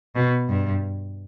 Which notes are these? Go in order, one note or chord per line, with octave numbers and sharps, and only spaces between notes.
B2
G2